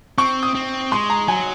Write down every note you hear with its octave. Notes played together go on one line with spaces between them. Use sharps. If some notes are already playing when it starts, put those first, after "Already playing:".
C4 C#6
D#6
C4
G#3 C6
A#5
F#3 G#5